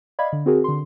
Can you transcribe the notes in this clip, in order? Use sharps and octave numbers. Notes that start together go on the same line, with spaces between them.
D5 D#5 F5 B5 G#6
D3
C4 F#4 G#4 A#4
D3 C6